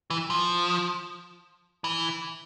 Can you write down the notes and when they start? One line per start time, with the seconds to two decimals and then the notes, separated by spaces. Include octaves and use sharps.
0.10 E3
0.30 F3
1.84 E3